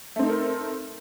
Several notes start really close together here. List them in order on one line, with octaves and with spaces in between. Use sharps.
A3 C4 D#4 A4 A#4